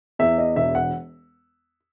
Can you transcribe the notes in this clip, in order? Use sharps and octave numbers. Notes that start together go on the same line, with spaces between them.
E2 E5
D#5
E1 E5
F#5